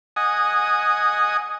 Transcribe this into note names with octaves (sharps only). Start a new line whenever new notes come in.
D#5 F#5 G#5 D#6